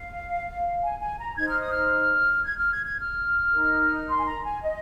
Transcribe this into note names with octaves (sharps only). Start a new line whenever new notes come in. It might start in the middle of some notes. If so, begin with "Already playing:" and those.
Already playing: F5
G#5
G#5
A#5
D#4 C5 G#6
F6
D#6
F6
G#6
F6
G#6
G#6
F6
D#4 A#4
C6
G#5
A#5
G#5
D#5